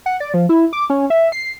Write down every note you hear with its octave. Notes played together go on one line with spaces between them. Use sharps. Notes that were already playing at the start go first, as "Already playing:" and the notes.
F#5
D5
F3
E4
D6
C#4
E5
C7